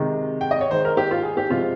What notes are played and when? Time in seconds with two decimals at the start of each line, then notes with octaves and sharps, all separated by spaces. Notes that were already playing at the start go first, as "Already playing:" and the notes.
Already playing: C3 D#3 G#3
0.41 G5
0.51 D#5
0.61 C#5
0.71 D#3 G#3 C5
0.85 A#4
0.97 G4
1.11 F4
1.23 G#4
1.37 G4
1.50 C3 F3 G#3 F4